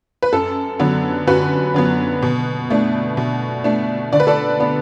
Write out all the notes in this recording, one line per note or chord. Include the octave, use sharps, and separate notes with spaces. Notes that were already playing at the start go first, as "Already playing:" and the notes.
B4
F#2 A4
D3 F#3 B3
F#2 F#4 B4
D3 F#3 B3
B2
A3 D4
B2
A3 D4
D3 D5
B4
A4 D5
B3 D4